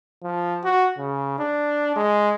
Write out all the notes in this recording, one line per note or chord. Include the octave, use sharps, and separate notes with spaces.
F3
F#4
C#3
D4
G#3